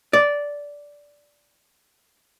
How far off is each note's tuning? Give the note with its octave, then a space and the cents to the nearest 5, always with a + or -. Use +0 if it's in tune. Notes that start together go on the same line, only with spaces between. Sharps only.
D5 -10